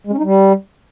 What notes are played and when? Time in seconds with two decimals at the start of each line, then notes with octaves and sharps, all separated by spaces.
0.07 G#3
0.12 C#4
0.18 D#4
0.23 G3